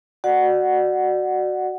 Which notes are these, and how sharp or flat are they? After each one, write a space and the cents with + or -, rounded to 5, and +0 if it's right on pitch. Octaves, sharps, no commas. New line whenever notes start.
F#4 +0 D5 +25 F#5 +0